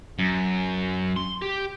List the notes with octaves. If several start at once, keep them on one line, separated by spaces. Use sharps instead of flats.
F#2
C6
G4